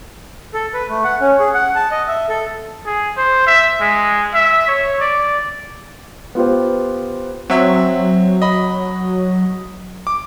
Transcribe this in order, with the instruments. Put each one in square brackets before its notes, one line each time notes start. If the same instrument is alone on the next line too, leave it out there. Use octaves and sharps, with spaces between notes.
[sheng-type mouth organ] A4
B4
A3
F#5
C#4
G#4
F#5
A5
D#5
E5
A4
[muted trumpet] G#4
C5
E5
G#3
E5
C#5
D5
[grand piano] B3 F4 G4 C5
[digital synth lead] F#3 [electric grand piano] C4 E5
[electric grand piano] D#5 B5
D6